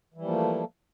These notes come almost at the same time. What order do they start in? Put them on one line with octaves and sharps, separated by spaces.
E3 G3 F3 A#3 A3